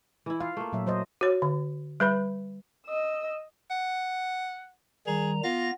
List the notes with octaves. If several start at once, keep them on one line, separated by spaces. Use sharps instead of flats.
E3 E4
F4 F5
A3 A#3
A#2 F#3 E5
F#3 C5 D#5
F#4 C#5
D3
G3 B4 B5
D#5 E6
F#5
D#3 G3 G#4 A#5
B3 F4 A#6